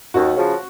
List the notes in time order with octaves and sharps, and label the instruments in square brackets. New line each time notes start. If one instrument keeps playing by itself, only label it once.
[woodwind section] D#2 [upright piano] F#4
[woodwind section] C#3 F3